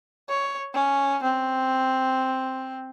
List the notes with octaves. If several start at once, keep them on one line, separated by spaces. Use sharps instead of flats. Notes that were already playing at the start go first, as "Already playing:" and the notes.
C#5
C#4
C4